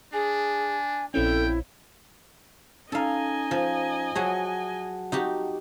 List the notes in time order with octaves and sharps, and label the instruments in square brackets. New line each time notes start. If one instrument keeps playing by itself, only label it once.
[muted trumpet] D4 [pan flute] G#4 [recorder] G#5
[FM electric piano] A#1 C4 C#4 [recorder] E4 [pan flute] A4 [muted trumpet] G5
[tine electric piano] C#4 D#4 A#5 [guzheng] A4 F5 [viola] D#5 G#5
[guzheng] F3
[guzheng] F#3 F#4 G#4 [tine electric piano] F#5 A5
[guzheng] D#4 F#4 G4